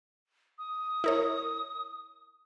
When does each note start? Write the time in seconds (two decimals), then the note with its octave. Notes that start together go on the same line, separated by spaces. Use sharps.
0.58 D#6
1.04 E4 A#4 C#5